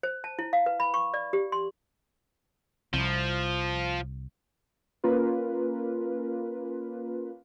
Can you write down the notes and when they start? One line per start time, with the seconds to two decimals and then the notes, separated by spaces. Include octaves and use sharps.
0.03 C5
0.24 A5
0.39 E4
0.53 F5
0.66 B4
0.80 B5
0.94 C#6
1.14 D5
1.33 G4
1.52 C6
2.94 C2 F3
5.04 A#3 C#4 F4 A#4 B4